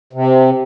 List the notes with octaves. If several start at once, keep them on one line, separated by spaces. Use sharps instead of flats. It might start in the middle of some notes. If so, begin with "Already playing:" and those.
C3